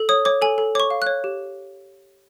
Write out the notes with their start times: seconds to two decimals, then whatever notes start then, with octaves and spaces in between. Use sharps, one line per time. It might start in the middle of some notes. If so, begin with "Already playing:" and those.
Already playing: A4
0.09 C#5 D#6
0.25 C#5 D6
0.42 A4 G#5
0.58 A4
0.75 C#5 D6
0.80 C#6
0.90 F5
1.02 C#5 F#6
1.24 G4